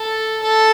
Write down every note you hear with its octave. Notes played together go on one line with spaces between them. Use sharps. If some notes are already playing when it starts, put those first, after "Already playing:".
Already playing: A4
A4